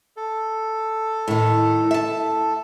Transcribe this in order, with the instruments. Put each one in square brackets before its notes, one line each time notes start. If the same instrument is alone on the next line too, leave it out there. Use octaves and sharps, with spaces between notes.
[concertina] A4
[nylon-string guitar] A2 D#3
E5 A5